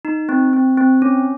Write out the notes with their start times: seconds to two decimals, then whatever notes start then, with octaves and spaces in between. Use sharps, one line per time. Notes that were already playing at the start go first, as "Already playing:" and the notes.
0.05 D#4
0.29 C4
0.53 C4
0.78 C4
1.02 C#4